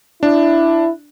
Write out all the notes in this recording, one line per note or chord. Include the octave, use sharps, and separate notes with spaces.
D4 E4